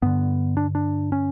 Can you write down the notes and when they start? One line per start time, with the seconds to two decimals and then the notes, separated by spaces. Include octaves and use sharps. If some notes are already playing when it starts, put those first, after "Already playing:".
0.02 G2 D3 B3
0.57 D4
0.75 D4
1.12 C#4